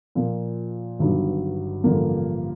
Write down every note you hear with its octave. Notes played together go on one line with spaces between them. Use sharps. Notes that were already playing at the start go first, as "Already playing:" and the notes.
A#2 F3 A#3
G1 G2 D#3 F#3
A1 G2 D3 F3 A#3